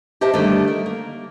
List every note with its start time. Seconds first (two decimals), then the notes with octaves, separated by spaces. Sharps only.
0.21 G4 C5 D#5 E5 A5
0.33 D3 D#3 G3 A3
0.68 A#4
0.86 A#3